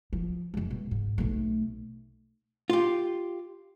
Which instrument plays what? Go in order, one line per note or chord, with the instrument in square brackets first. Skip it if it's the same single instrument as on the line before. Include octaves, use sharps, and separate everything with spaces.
[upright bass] F3
F#2 G#3
B2
G#2
B1 A3
[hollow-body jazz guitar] F4 G4